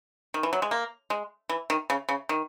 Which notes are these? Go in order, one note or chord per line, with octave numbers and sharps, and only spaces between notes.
D#3
E3
F#3
G#3
A#3
G#3
E3
D#3
C#3
C#3
D#3